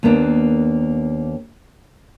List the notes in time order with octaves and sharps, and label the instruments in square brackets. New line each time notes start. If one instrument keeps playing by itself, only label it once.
[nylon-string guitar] D#2 A#3 B3 D4